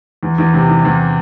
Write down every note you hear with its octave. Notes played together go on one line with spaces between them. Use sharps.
E2
E2
C3
E3
E2